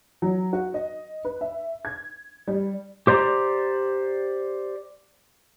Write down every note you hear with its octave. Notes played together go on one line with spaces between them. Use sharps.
F#3
F#4
D#5
B4
E5
G#6
G3
G4 C5 D5 A#5